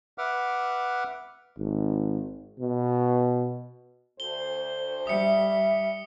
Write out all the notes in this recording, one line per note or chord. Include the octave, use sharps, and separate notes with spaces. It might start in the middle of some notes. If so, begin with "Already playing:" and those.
B4 E5 F#5 D6 F6
G#1
B2
D2 C5 G7
G3 E5 D#6 C#7